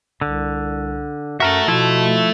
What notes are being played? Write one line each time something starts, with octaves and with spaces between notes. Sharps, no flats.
C2 D3
F#2 F#4 A4 A#4 E5
B2 F3 E4